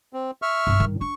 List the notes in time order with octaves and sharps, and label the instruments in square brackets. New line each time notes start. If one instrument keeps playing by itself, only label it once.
[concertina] C4
E5 C#6 F6
[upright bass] G2 B3
G2 D#3
[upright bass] D4 [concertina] C#6